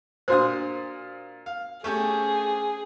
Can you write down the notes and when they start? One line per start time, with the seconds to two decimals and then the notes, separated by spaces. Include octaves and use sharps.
0.28 A#2 D4 F4 F#4 C5 D#6
1.46 F5
1.84 A3 C#4 G4 G#4